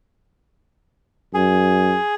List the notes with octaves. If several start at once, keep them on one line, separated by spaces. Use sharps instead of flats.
F#2 G#4